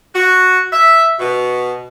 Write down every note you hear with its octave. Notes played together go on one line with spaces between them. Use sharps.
F#4
E5
B2